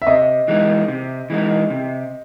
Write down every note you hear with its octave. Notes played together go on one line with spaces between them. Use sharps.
E5
C3 D#5
E3 G#3 D#4
C3
E3 G#3 D#4
C3